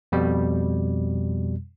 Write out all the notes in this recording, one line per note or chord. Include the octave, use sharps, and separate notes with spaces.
F2 B2 G3